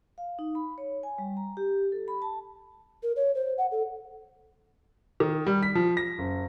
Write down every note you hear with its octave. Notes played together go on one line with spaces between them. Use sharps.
F5
D#4
B5
C#5
G#5
G3
A#5
G4
A4
B5
A5
A#4
C#5
C5
F#5
A4
D#3
G3
B6
F3
A#6
F#1